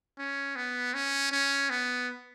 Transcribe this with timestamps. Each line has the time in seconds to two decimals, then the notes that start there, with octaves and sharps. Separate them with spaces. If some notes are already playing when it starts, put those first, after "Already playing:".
0.19 C#4
0.56 B3
0.94 C#4
1.32 C#4
1.70 B3